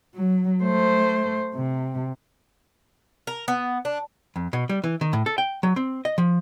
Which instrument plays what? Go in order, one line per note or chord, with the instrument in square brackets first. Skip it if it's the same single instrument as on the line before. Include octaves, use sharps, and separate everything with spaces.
[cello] F#3
A3 C5
C3
[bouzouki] A#4
B3
D4
[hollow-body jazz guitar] F2
B2
G3
E3
D#3
A2
A4
G5
F#3
C4
D#5
F3